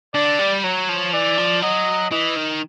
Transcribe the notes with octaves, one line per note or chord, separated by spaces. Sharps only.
D3 D5
G3
F#3 C#5
F3
E3 D5
F3
F#3 D#5
E3 D#5
D#3